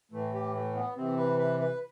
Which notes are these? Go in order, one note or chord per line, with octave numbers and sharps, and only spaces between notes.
A2 E3 A3
G4
A3
B3
C3 E3 C4
B4
B4
B4